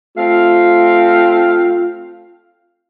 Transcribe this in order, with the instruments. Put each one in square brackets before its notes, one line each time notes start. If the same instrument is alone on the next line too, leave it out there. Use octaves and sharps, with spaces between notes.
[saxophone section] A3 C4 F5 [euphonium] F4